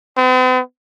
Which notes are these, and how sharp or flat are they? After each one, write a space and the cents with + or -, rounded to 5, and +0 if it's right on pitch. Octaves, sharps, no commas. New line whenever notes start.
C4 -45